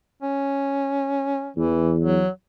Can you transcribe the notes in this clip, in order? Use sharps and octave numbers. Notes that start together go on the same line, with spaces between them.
C#4
E2 E3
F#3